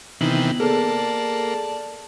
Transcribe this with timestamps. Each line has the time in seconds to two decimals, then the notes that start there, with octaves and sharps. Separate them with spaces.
0.21 C3 D#3 E3 B3 F#7
0.60 A#3 G#4 A4 D5 A5